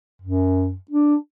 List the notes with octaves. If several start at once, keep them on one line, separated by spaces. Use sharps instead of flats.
F#2
D4